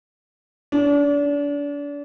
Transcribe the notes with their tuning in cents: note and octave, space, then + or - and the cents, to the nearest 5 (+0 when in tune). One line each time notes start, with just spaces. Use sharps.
D4 -35